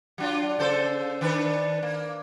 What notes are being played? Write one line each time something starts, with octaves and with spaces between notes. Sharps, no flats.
F#3 D4 F4
C#3 A4 C5
D#3 D4 B4
A#3